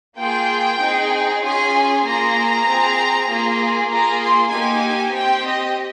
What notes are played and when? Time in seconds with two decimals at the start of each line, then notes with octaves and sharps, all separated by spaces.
0.19 A#3 F4 G#4 G5
0.82 C4 D#4 G#4
1.43 C#4 F4 G#4 G#5
2.05 A#3 F4 G#4 A#5
2.67 C4 F4 G#4
3.29 A#3 F4 G#4
3.91 A#3 F4 G#4 A#5
4.22 C6
4.53 A#3 D#4 G4 G#5
5.15 C4 G4 G5
5.46 D#5